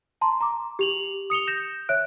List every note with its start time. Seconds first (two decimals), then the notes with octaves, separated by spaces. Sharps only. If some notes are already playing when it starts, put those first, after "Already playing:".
0.21 A5 A#5 C6
0.41 A#5 D6
0.79 G4 F7 F#7
1.30 D#6 C#7 F7 G7
1.47 G6 A#6 E7
1.89 C#5 E5 F#6 D7